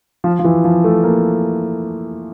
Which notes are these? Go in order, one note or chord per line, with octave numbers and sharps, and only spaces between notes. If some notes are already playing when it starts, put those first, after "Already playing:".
F3
F3
E3
F3
A3
A#3